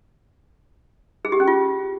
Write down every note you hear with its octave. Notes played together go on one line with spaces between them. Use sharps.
G#4
G4
C#4
F4